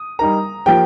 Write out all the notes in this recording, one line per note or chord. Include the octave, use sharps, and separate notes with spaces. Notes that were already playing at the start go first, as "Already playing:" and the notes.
Already playing: D#6
G3 D#4 A#4 A#5
F3 A#3 G4 A#4 G5